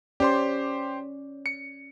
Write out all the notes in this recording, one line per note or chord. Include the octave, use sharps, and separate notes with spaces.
C#4 G4 C5 D5 C6
C#7